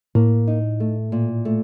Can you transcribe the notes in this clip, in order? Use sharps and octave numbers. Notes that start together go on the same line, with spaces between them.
A2 A#3
D#4
A3
A#2
A3